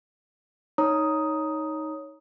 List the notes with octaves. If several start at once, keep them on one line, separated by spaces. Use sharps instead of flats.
D#4 C#5 A#5 D#6